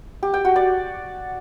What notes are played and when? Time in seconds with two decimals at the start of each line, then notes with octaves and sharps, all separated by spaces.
0.23 G4
0.34 G5
0.45 F#4
0.56 D5